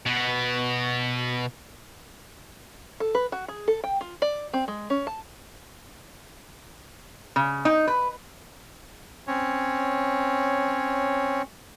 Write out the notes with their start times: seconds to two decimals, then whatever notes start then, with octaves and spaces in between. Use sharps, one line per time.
0.06 B2 B3
3.00 A4
3.15 B4
3.32 F#4
3.48 G#4
3.68 A4
3.84 G5
4.01 F4
4.22 D5
4.54 C4
4.68 G#3
4.90 C#4
5.07 A5
7.36 C#3
7.65 D#4
7.87 B4
9.27 C4 C#4 C#5